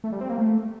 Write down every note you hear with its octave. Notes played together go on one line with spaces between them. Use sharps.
A3
G3
C4
A#3
A3